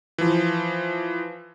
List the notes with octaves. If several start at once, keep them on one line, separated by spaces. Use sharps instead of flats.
E3 F3